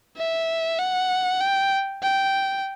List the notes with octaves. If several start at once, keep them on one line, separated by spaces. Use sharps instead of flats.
E5
F#5
G5
G5